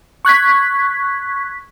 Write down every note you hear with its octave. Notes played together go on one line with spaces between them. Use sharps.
C#6 F#6 G#6 B6